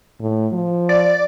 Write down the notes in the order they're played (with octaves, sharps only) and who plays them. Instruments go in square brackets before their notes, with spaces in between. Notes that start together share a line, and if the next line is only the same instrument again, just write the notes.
[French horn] A2
F3
[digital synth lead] D5